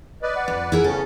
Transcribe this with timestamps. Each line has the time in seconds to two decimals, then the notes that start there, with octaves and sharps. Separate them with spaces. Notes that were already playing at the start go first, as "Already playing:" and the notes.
0.22 B4 D5 D#5
0.36 F#5
0.48 F2
0.72 E4 G#4 A#4
0.84 C#3 B3 C#4 A4